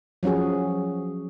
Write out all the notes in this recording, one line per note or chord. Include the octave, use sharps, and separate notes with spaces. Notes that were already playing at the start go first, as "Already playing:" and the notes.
F3 F#3 C#4 F#4 G#4